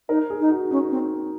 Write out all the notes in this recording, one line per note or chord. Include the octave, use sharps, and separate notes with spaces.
D#4 A#4
G#4
D#4
F#4
C#4 D#4
C4